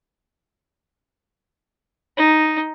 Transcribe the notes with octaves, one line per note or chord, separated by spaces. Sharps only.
D#4